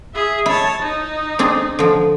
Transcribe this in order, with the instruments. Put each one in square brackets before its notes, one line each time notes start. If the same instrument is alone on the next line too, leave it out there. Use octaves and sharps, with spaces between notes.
[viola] G#4 E5
[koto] E4 [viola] C#5 A5
[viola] D#4
[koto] C4 D4 G#4
D3 F3